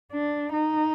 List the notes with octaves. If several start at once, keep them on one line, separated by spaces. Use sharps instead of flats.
D4
D#4